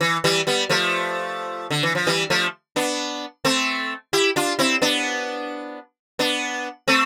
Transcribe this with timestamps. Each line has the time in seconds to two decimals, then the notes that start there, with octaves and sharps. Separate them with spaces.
0.01 E3
0.24 E3 G3
0.47 G3 B3
0.69 F3 A3
1.71 D3
1.83 E3
1.95 F3
2.07 E3 G3
2.30 F3 A3
2.76 B3 D4
3.45 A3 C4
4.13 E4 G4
4.36 D4 F4
4.59 C4 E4
4.82 B3 D4
6.19 B3 D4
6.88 A3 C4